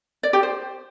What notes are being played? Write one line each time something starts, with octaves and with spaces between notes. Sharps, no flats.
D5
G4
C5